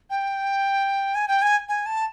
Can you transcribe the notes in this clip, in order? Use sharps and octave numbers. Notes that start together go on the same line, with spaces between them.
G5
G#5
G5
G#5
G#5
A5